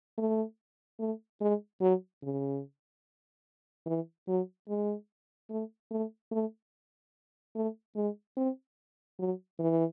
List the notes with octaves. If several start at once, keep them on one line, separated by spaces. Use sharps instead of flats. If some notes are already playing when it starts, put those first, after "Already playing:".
A3
A3
G#3
F#3
C#3
E3
F#3
G#3
A3
A3
A3
A3
G#3
C4
F#3
E3